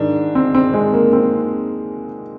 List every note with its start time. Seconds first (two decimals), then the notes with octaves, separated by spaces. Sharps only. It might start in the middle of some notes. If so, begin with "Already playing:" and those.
Already playing: G#2 D#3 D4
0.35 C4
0.55 C4
0.74 G#3
0.93 A#3
1.13 C4